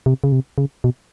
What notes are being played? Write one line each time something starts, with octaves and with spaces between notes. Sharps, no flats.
C3
C#3
C3
C#3
B2